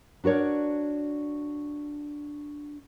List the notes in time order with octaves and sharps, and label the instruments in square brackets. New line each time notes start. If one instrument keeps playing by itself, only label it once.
[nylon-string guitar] D4 F#4 A#4 C#5 D5